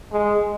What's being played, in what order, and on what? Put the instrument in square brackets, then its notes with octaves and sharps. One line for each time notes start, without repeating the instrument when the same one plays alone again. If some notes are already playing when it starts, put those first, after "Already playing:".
[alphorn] G#3